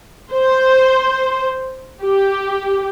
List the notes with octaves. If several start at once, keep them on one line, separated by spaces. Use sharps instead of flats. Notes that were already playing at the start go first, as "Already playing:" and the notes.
C5
G4